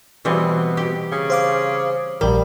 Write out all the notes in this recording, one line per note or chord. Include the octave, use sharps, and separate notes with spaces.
B2 E3 G3 C4
G4
C#3
C5 F5 D6
A#1 G3 A#4